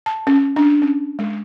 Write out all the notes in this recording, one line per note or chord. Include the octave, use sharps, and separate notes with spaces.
A5
C#4
D4
C#4
G#3